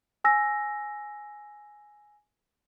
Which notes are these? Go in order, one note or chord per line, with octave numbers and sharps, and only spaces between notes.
G#5 E6 A#6